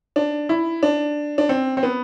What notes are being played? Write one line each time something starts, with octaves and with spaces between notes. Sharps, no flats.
D4
E4
D4
D4
C4
C4
B3